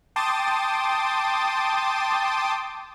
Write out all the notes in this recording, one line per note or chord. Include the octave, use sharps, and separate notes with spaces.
G5 A5 C6 D6 D#6 A6